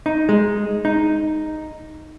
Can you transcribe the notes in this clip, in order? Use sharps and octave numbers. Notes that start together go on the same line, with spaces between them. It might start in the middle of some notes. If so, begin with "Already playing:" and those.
D#4
G#3
D#4